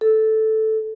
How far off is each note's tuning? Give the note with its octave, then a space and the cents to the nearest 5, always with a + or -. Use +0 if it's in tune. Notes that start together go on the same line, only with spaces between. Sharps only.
A4 -5